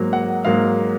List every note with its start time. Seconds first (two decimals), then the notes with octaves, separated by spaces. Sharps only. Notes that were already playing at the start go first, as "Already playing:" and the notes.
Already playing: G#2 F#3 A#3
0.13 F#5
0.45 G#2 F#3 A#3 F5